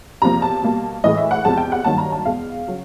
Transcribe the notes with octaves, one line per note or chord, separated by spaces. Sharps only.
E2 C3 F3 A#3 A#5
A5
B2 G3 A#3
A2 E3 G#3 D#5
E5
F#5
E2 C3 F3 G#3 A5
G5
F#5
G2 D#3 F#3 A#3 A5
A#5
A5
E2 B2 G#3 F5
C#3 F#3